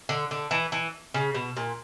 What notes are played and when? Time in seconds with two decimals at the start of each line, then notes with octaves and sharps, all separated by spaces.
0.09 D3
0.31 D3
0.51 E3
0.72 E3
1.14 C#3
1.34 B2
1.57 A#2